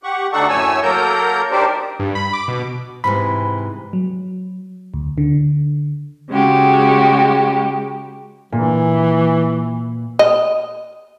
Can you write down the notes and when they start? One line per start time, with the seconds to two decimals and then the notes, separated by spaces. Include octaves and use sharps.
0.03 G4 F#5 C#6
0.32 D2 D4 D#4 A4 F#5 C#6
0.49 F#2 A2 A3 C#5 G#5 E6
0.83 F#3 A#3 A4 A#4 A#5 G6
1.51 D4 D#4 G4 A#4 C5 D5
1.99 G2
2.15 B5
2.33 D6
2.48 B2
3.04 G#2 C3 E3 B5
3.93 F#3
4.94 D2
5.18 D3
6.30 C#3 G#3 F#4 G4
8.52 A#2 E3
10.19 D#5